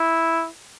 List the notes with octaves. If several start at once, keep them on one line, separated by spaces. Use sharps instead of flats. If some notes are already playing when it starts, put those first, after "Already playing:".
Already playing: E4